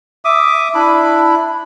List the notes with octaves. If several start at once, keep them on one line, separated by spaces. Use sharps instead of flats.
E5 D6 D#6
D4 E4 B5